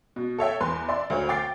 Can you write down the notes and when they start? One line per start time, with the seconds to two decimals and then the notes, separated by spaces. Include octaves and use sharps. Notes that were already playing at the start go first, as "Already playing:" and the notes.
0.16 B2
0.38 A4 C#5 E5 G5
0.61 E2 B4 C6
0.88 D5 E5 C6
1.10 D2 C5 C#5
1.29 G5 D6 A6 C7